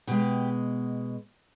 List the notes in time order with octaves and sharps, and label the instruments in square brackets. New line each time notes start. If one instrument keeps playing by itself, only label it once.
[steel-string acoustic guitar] B2 G#3 G4